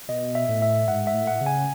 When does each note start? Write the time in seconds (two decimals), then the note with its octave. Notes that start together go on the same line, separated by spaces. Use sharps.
0.09 B2 D#5
0.35 E5
0.49 A2
0.62 E5
0.88 G#2 F#5
1.07 E5
1.14 A2
1.27 F#5
1.41 C#3
1.46 G#5